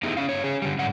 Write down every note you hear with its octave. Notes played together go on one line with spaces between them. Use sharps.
A3 B3 D#4 E4 G4 G#4
C#4 F5
G2 C#5
C#4 G#4
D3 G3
G#2 G3 F#5